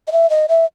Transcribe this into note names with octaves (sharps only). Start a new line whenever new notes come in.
D#5
E5
D#5
E5